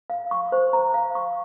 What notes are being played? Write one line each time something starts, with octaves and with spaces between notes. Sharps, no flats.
F5
C#6
C5
A#5
F5
C#6